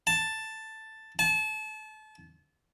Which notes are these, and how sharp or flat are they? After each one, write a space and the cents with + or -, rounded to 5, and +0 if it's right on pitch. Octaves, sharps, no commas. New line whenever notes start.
A5 +5
A5 -30